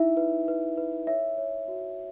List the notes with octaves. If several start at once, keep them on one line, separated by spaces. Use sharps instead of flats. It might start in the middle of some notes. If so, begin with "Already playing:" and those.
Already playing: D#4 E4 E5
B4
B4
B4
C#5 E5
C#5
F#4